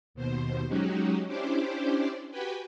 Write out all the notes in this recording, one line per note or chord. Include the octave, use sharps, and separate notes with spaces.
D#2 B2 C5
F#3 G#3 C#4 D#4 F#4 G4
C#4 D4 E4 G4 C5 D5
F#4 G4 B4 G5 G#5